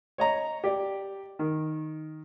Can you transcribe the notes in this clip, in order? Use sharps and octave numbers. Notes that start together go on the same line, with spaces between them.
C#5 D#5 A#5
G4 D5
D#3